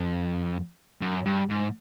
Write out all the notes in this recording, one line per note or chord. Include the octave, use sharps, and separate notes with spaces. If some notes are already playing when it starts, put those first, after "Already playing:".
Already playing: F2
F#2
G2
G#2